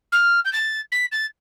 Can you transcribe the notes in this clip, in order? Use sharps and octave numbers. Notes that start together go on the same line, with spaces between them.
F6
G6
A6
B6
A6